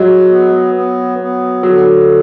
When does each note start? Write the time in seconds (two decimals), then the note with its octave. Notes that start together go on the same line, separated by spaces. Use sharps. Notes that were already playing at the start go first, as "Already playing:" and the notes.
Already playing: F#3 G#3
0.28 B3
0.74 B3
1.18 B3
1.63 D3 F#3